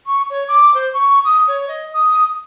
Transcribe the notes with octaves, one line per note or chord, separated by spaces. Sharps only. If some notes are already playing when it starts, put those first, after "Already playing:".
C#6
C#5
D6
C5
C#6
D#6
C#5
D#5
D#6